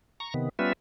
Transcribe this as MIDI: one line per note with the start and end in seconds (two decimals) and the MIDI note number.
0.20 0.34 82
0.20 0.34 85
0.34 0.49 48
0.34 0.49 51
0.34 0.49 59
0.59 0.73 55
0.59 0.73 59
0.59 0.73 61
0.59 0.73 65
0.59 0.73 71
0.59 0.73 76